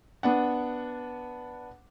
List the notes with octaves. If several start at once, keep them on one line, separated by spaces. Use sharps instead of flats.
B3 D4 F#5